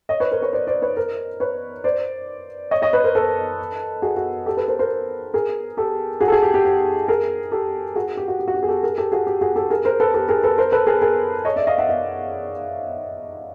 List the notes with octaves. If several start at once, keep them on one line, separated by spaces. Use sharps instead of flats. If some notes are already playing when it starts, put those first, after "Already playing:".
C#5 D#5
B4 C#5
A#4 C5
B4 C#5
C5 D5
C5 D5
B4 C#5
A#4 C5
B4 C#5
C5 D5
C#5 D#5
C#5 D#5
B4 C#5
A#4 C5
A4 B4
F#4 G#4
F#4
G4 A4
A4 B4
A#4 C5
A#4 C5
G#4 A#4
G4 A4
F#4 G#4
A4
F#4 G#4
G4
G4
G4
G#4 A#4
G4 A4
F#4 G#4
G4
F#4
G4
F#4
G4
G#4
G4 A4
G#4 A#4
G4 A4
F#4 G#4
G4
F#4 G#4
G4 A4
G#4 A#4
A#4 C5
A4 B4
G4 A4
G#4 A#4
A4 B4
A#4 C5
A4 B4
G#4 A#4
G#4 A#4
C#5 D#5
D5 E5
D#5 F5
E5 F#5
D#5 F5